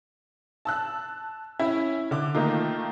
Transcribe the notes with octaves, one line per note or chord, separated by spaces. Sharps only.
A5 E6 F#6
C#4 E4
D3 D6
D#3 A3 A#3 D#4 F4